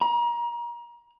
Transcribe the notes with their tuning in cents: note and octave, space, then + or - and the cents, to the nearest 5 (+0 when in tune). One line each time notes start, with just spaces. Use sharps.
A#5 +30